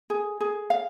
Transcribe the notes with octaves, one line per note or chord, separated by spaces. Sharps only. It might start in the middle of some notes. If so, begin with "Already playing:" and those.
G#4
G#4
F5